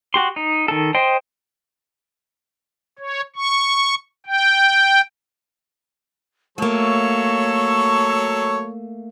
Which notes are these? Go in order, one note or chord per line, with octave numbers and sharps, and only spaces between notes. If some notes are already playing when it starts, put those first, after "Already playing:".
F#4 G4 C6
D#4
D#3 A4
C5 D#5 G5 C6
C#5
C#6
G5
F#3 A3 A#3 A4 C#5 C#6